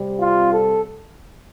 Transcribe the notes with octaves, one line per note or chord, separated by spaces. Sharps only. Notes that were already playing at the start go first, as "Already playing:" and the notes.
Already playing: C3 G3 C4
F4
A4